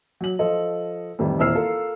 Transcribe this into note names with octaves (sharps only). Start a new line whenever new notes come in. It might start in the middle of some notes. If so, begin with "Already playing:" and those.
F#3 F#7
F3 F4 A4 D#5
F2 A2 D#3 E3 G3
D#1 C4 E4 E6 F6 C7
F4 A4 A#4